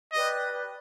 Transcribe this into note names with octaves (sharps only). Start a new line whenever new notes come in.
G4 B4 D5 D#5